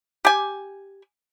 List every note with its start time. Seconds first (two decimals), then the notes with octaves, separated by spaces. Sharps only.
0.25 G4 G#5